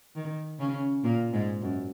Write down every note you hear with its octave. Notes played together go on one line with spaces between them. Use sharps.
D#3
C#3 C#4
A#2 A#3
G#2 G#3
F#2